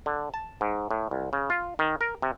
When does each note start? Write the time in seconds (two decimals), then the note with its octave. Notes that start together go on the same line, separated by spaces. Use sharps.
0.06 D3
0.34 A5
0.61 G#2
0.91 A2
1.11 C2
1.33 C#3
1.50 F4
1.79 D#3
2.01 A#4
2.22 C3